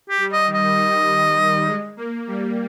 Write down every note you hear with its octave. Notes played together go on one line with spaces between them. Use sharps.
G4
G3
D#5
D#3
D#5
G3
G#3
A#3
G3